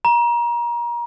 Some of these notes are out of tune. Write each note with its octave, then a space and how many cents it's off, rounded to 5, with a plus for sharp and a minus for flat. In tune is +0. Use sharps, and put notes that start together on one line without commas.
A#5 +30